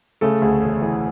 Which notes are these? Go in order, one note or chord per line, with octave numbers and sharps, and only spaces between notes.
C#3 A3 A4
D2 G#4
E1 G#4
E3 G#4